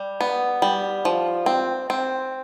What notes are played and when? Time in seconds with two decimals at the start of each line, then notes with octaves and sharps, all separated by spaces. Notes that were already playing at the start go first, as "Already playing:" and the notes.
Already playing: G3
0.21 B3
0.62 G3
1.05 F3
1.46 C4
1.90 C4